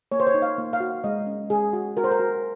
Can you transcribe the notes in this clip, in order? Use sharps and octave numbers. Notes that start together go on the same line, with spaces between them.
A#3 C#5
C5
C#5
D#4
F5
A#3
F5
F#4
G#3 D#5
C#4
G#3 G#4
F#4
F#4 A#4
C5
A#4
F#4